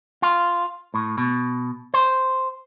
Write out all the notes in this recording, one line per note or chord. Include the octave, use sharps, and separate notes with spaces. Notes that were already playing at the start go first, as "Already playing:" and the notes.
F4
A2
B2
C5